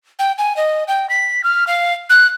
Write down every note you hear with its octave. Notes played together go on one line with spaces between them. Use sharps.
G5
G#5
D#5
G5
B6
F6
F5
F#6